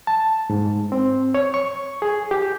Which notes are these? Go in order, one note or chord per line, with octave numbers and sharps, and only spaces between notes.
A5
G#2
C4
C#5
C#6
G#4
G4